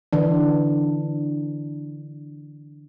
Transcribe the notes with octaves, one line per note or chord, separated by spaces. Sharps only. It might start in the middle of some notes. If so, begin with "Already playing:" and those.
D3 E3 D4